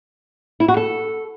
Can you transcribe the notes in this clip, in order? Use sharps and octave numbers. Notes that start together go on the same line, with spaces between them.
E4
F#4
A4